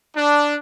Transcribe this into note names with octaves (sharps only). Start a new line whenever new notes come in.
D4